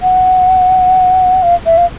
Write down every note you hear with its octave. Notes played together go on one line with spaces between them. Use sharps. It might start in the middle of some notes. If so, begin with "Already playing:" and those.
F#5
F5
E5
F5